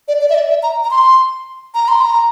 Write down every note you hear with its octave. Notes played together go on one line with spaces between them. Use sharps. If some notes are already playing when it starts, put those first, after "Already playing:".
D5
D5
E5
D5
E5
A#5
A#5
C6
A#5
C6
A#5